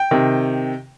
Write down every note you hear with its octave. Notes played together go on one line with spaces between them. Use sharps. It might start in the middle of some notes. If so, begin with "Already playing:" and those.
Already playing: G5
C3 D#3